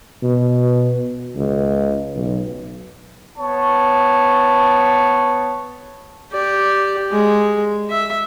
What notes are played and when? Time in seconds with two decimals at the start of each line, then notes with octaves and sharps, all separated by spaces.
0.23 B2
1.36 C#2
2.16 B1
3.38 B3 C#5 A5
6.33 G4 D5
7.11 G#3
7.90 E5